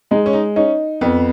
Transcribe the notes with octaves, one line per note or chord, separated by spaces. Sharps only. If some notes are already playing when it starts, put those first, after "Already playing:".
G#3 D#4
C#4
D#4
C#4 D#4
F2 B3